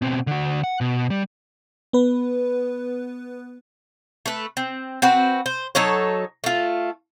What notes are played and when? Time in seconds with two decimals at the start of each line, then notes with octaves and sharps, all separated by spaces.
0.02 B2 C4
0.27 D3 F#4
0.64 F#5
0.81 B2
1.10 G3
1.93 B3 B4
4.26 A3 B4
4.57 C4
5.02 C4 F#4 B4
5.46 C5
5.75 F#3 D#4 A4 C#5
6.44 A3 F4